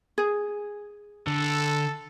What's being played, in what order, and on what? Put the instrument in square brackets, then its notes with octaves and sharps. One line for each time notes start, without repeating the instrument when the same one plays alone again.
[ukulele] G#4
[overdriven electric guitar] D3 [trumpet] A4